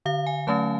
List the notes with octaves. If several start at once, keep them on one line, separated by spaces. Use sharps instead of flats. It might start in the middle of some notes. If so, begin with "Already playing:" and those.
D3 F5
G#5
F#3 A3 C#4 A5